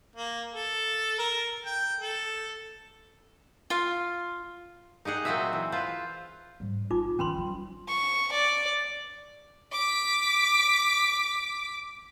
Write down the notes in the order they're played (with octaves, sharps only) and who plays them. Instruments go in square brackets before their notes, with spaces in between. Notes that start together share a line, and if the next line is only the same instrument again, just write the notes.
[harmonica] A#3
A4
A#4
G5
A4
[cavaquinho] F4 F5
[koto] D#4 G4 G#4 F#5
A#2 F#3 C4 C5 D#5 E5
E3
F4 B4 C5
[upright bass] G#2 G3
[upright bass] A1 D4 [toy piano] D#4 F4 D6
[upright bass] D#3 F3 [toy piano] C#4 B5 C6
[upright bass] F3 G3
[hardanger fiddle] C#6
D5
[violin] D6 B6